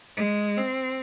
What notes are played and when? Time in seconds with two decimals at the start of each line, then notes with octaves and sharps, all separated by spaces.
0.16 G#3
0.57 C4